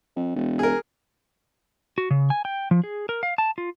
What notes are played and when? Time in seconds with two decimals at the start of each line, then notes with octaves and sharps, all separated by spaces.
0.16 F2
0.36 E1
0.59 G#4 A#4
1.98 F#4
2.11 C#3
2.30 G#5
2.45 G5
2.71 F3
2.84 G#4
3.09 A#4
3.23 F5
3.38 A5
3.58 F4